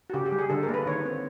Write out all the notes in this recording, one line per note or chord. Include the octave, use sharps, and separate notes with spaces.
F#4
C#3 G4
G4
G3
G#4
D3 A4
A#4
A#3
B4
D#3 C#5
C4